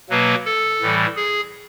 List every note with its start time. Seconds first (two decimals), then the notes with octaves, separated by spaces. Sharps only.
0.10 B2 F#3 A#3 B4
0.45 A4
0.81 A2 E3 G3
1.16 G#4